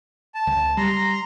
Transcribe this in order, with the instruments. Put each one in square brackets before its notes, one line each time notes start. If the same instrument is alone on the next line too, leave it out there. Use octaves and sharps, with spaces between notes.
[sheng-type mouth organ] A5
[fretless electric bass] C#2
[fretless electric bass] G3 [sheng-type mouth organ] A#5 C6